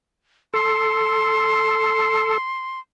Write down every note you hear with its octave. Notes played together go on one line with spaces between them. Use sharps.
A4 C6